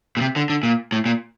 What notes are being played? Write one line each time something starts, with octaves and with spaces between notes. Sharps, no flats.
A#2
C3
D3
D3
A#2
A2
A#2